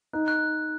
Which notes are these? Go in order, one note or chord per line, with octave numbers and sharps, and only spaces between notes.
D#4 F#6
F#6